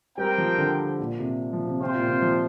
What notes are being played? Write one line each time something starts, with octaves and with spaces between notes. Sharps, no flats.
G3 C4 A#4 G5
F3
D3
A#2
C3
F3
C3
C3 F4 C5 G5
A#2
C3
F3